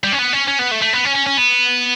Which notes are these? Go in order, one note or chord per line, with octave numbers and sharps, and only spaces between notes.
G3
C#4
B3
C#4
C#4
B3
A3
A3
B3
C#4
C#4
C#4
B3